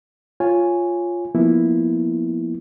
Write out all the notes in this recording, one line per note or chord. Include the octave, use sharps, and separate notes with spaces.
F4 C#5 G#5
F3 A#3 B3 E4